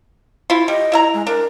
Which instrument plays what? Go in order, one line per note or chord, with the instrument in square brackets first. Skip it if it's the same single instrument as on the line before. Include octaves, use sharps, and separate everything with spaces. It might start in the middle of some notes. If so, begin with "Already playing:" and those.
[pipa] E4 F4
[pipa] G3 [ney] D#5
[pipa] E4 E5 A#5
[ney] G#3
[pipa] D4 [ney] A#4